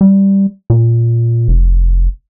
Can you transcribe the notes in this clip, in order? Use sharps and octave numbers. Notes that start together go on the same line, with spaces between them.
G3
A#2
F1